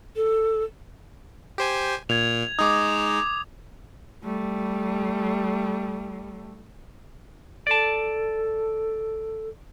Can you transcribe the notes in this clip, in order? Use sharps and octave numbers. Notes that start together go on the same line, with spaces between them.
A4
G4 C5 G#5
A#2 G#6 F7
G#3 D#4 D6 D#6
G3 A3
A4 D5 A5